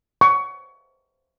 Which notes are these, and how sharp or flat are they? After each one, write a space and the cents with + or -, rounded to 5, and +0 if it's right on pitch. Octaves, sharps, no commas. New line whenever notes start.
C#6 +20